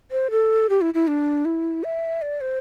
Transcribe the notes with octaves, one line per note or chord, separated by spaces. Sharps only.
C5
A4
G4
E4
E4
D4
E4
E5
D5
C5